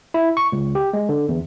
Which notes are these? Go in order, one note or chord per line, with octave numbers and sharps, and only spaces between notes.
E4
C#6
C#2
G4
G#3
D3
E2